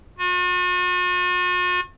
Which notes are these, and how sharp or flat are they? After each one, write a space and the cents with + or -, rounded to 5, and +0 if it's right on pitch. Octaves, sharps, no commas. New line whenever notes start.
F#4 -45